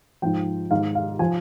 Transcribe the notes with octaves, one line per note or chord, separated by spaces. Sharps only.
G#2 F3 G5
G#2 D#3 F5
F5
F3 G#5